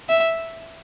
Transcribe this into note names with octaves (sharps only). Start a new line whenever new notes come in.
E5